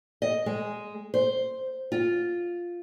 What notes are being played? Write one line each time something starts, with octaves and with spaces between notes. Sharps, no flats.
D#5
G#3
C5
F4